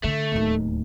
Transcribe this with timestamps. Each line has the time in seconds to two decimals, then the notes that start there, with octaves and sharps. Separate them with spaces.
0.04 D3 A3
0.32 D1 D#2